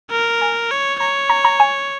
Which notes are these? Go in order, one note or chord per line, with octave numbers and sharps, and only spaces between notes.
A#4
G#5
C#5
C#5 A#5
A#5
A#5
G#5